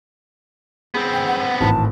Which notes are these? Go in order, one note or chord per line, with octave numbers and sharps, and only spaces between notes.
B3 C4 G#4
G5
F#5
G#1 A2 E3 A5